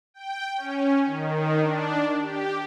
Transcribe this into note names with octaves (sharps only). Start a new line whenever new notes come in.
G5
C#4
D#3
D4
G4